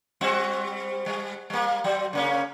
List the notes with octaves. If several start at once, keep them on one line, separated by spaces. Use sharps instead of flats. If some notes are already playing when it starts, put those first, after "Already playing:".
G3 C4 F#4
G3
G3 A#3
F#3
C#3 A#3 C#4